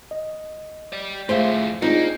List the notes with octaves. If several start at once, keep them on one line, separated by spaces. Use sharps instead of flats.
D#5
G4 D5
F2 A2 A3 F4 G#4 C5 E5
A#3 C4 D4 D#4 F4 G#4